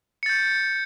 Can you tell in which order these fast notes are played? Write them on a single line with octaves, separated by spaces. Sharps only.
C#7 A6 G6